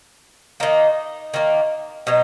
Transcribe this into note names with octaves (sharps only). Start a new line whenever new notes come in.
D#3 A#3 D#4
D#3 A#3
B2 F#3 D#4